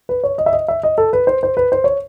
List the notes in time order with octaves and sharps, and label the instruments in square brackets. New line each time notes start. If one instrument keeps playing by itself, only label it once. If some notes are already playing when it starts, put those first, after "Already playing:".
[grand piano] B4
C#5
D#5
E5
D#5
E5
D#5
A4
B4
C5
C5
B4
C5
C#5